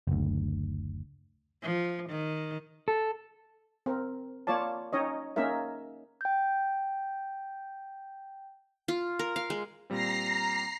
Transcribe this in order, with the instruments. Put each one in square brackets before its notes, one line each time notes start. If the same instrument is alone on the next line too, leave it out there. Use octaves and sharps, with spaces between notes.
[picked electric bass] F#1 D2
[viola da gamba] F3
D#3
[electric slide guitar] A4
[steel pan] C4 A#4
A#3 F4 C#5 D5 A5
C#4 D#4 C#5 D#5
A#3 C#4 D#4 A#4 E5
[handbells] G5 G6
[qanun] F4
A#4
F5
G#3
[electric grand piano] A#2 G3 C4 [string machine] A#5 A#6 C7